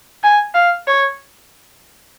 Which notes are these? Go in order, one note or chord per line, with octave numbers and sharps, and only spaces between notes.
G#5
F5
C#5